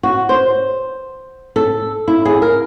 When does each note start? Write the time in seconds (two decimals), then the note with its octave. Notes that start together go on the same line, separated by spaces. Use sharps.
0.03 F#4
0.29 C5
1.56 A4
2.08 E4
2.25 G#4
2.42 A#4